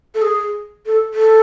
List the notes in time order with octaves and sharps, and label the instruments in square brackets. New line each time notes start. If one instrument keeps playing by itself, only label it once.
[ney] A4
G#4
A4
A4